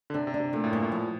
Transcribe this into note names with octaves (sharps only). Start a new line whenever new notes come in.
D3
C3 D4
C3
D4
C3
A#2 A3
A2
G2 A#2
A2
F3